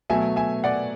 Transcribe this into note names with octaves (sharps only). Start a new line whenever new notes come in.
B2 F#3 A3 E5 G#5
E5 G#5
D5 F#5